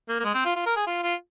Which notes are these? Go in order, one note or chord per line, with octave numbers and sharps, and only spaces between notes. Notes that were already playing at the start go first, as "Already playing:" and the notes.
A#3
A#3
G#3
C4
F4
F4
A#4
G#4
F4
F4